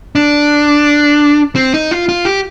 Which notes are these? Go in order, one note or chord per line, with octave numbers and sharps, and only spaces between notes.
D4
C4
D#4
F4
F4
G4